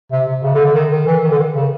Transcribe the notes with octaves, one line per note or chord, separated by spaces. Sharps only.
C3
C3
C#3
D3
D3
D#3
D#3
E3
D#3
D3
D#3
C#3